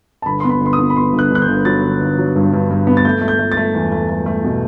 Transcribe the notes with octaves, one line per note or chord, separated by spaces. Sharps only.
A5
G1 B5
B3 C6
B5
G1 C6
D#6
B3
B5
B3 C6
G1
F#6
G1 F#6
G6
G1
F#3 A6
G1
G1
F#3
G2
G2
G2
B3
A6
A3 G6
A3
G6
A3
A6
A3
E2
A3
A3
A3
B2